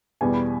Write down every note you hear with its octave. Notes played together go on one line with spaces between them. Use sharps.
E2 B2 G3 B3 G#5
B5